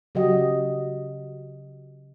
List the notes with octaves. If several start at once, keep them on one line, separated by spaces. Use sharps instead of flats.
C#3 F#3 F#4 G4 D#5